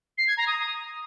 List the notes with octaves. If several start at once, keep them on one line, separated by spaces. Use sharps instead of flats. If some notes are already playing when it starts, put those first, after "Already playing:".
C7
G#6
A#5
D#6